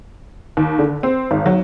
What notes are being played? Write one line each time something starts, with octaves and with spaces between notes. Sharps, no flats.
D#2
D3
C4
G#1
F#3